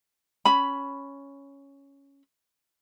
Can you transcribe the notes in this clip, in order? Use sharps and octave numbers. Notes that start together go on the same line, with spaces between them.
C#4 B5